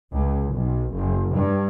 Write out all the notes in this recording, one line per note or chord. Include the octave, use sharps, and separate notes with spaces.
C#2
B1
F#1
G2